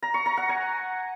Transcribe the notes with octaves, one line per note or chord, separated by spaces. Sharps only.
A#5
C#6
A#5
F#5
G#5